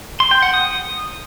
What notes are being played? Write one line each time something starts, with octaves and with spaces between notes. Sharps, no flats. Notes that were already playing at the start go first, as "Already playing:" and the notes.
C6
G5
F#5
D#6